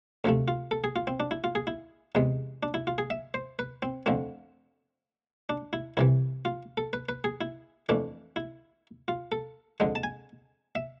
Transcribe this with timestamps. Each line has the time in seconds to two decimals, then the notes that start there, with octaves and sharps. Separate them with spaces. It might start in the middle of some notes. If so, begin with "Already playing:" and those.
0.24 D2 C3 F3 A3
0.48 F4
0.71 A4
0.84 G#4
0.96 F4
1.07 C4
1.20 D4
1.31 E4
1.44 F4
1.55 G#4
1.67 E4
2.15 E2 C3 G#3
2.63 D4
2.74 E4
2.87 F4
2.98 G#4
3.10 E5
3.34 C5
3.59 B4
3.82 C4
4.06 F2 D3 F3 A3 C4
5.49 D4
5.73 E4
5.97 C2 C3 E3 E4
6.45 F4
6.77 A4
6.93 B4
7.09 B4
7.24 G#4
7.41 E4
7.89 F2 E3 A3 D4
8.36 E4
9.08 F4
9.32 A4
9.80 F2 D3 G#3
9.95 A5
10.03 G#5
10.75 E5